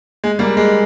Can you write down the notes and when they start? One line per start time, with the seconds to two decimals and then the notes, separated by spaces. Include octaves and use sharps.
0.24 G#3
0.39 G3 A#3
0.57 G#3